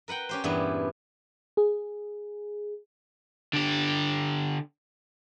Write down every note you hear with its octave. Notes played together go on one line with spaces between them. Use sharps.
A#4 B4 F#5 G5
C#4 G4 C5
E2 G2 A#2 B3 E4 G4
G#4
D3 G4